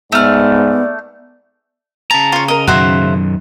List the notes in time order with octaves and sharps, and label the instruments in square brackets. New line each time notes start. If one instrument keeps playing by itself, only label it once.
[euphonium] G#2 [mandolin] A3 F6 [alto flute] B3 [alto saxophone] D5
[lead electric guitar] C#3 A#5 [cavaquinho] A5
[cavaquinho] F4 C#5
A#4 D#5
[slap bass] F#2 B2 D#3 [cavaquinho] F#4 C5 E5